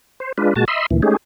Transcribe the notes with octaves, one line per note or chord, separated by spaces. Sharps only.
C5
G#3 D4 F4 B4
A#2 G#3 F#4 A5
D#5 E5 B5 C6
D2 A#2 E3
G#3 A3 C#4 D#4 G4 G#4